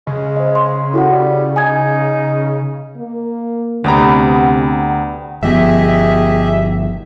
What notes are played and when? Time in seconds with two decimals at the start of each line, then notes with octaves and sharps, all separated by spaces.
0.07 C#3 G#3
0.36 C5 D#5
0.55 C6
0.93 A2 E4 F#4 F#5
1.11 G3
1.56 D#4 G#5 D#6 G#6
2.97 A#3
3.84 D2 C3 G3 B3 A#5
5.43 G1 F3 B3 G4 G#4 D#5 E5